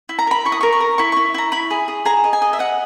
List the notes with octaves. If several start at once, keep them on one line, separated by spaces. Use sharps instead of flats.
E4
A#5
A#4 B5
E4 C#6
D#6
A#4 C#6
C#6
A#4
E4 C#6
C#6
E4
E4 A#5
E4 B5
G#4
G#4
G#4 A#5
D#5
G#5
D#5
E5
D#5 F#5